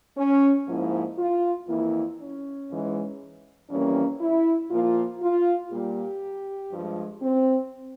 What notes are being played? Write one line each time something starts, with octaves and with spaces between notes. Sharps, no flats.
C#4
G#2 F3 A#3 E4
F4
F2 E3 A#3 E4
C#4
G#2 E3 G#3
F2 E3 G3 A#3 C#4
E4
A#2 F3 A#3 F4
F4
A#2 G3 A#3 G4
G2 F3 G#3
C4